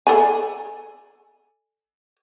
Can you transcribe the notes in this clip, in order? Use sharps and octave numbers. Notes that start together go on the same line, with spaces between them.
A4 D5 G#5